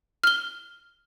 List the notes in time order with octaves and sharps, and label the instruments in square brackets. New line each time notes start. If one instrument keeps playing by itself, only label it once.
[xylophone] F6 G7